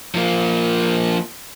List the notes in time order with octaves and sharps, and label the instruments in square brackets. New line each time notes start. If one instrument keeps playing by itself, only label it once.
[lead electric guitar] F3 A#3